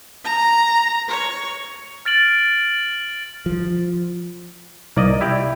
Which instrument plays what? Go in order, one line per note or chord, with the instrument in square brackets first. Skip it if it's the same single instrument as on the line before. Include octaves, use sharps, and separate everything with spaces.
[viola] A#5
C#5
[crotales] F6 A6 D7 F#7
[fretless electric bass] F3
[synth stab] C2 [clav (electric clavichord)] A#3 D5 D#5
[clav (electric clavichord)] E4 G4 D5